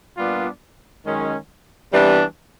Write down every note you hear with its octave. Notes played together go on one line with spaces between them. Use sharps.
A#2 G3 B3 D4 F4
F#2 D#3 G#3 C#4
C3 E3 G3 B3 D4